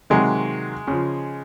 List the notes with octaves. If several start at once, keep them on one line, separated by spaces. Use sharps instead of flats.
C3 D#3 F#3 G#3
C#3 F3